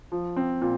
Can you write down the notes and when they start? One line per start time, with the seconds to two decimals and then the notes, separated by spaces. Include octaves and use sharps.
0.12 F3
0.36 C4
0.61 A#2